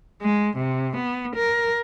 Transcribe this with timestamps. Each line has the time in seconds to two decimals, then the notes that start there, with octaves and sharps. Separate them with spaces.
0.21 G#3
0.57 C3
0.97 B3
1.36 A#4